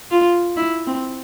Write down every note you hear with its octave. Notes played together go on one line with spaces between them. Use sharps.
F4
E4
C4